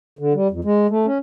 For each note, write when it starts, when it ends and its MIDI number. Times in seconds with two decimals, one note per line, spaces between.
0.19 0.33 50
0.34 0.48 55
0.51 0.60 41
0.64 0.87 56
0.90 1.06 57
1.06 1.18 61